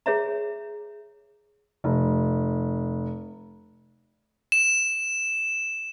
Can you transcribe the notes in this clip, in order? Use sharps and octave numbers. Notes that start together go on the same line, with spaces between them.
G#4 C#5 E5 A#5
F1
E7